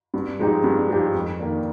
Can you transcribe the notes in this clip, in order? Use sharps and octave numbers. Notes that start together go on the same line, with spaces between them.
G2
F3 G#3 D#4 G4
G2
F3 G#3 D#4 G4
F2
D#3 A#3 D4